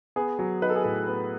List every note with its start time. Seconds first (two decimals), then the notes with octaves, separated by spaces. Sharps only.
0.16 B3 G#4
0.39 F#3
0.62 D#4 B4
0.69 A4
0.75 G#4
0.83 A2 A4
1.08 B3